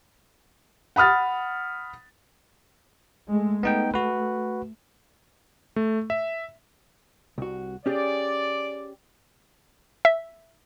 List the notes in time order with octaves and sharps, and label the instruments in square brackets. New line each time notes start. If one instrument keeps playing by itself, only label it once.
[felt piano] F#5 B5 D#6 F6 A6
[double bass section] G#3 A3
[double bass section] A3 [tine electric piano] B3 D#4 G5
[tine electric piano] F#4 B4
[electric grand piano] A3
E5
[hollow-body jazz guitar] C2 F#4
[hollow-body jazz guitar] C#4 G4 G#4 [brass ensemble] D5
[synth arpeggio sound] E5